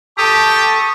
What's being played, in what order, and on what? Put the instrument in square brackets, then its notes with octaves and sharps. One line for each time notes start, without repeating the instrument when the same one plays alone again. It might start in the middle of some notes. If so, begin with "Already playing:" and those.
[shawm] G4 [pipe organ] A4 D#6 [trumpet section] A5 C#6